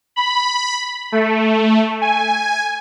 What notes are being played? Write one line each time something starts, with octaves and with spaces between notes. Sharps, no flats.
B5
A3
G#5